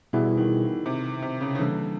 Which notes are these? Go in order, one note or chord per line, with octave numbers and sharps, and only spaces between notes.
B2 E3 G3 B3 E4 G#4
D#3
C3
C3
C#3
C#3
D3 E3 G3 A#3